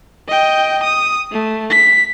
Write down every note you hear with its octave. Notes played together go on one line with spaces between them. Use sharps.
D#5 G5
D#6
A3
B6